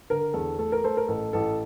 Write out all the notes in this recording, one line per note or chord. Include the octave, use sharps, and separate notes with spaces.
D3 A#4
E2 A4
A3 A4
A#4
A3 A4 C5
A#4
A1 A4
A1 A4